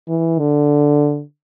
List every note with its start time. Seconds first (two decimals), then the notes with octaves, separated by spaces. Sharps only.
0.08 E3
0.39 D3